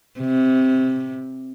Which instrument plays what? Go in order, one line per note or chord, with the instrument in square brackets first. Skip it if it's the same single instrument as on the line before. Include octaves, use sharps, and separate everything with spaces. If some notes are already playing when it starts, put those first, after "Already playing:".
[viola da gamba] C3